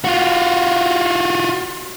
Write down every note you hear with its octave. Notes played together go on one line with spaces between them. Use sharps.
F4 F#4